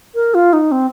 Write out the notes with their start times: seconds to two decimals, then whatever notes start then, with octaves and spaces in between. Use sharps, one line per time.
0.15 A#4
0.34 F4
0.53 D#4
0.72 C4